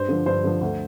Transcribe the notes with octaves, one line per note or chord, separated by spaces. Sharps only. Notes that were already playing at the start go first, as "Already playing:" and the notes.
Already playing: G2 C5
D3 F3
G2 C5
D3 F3
D2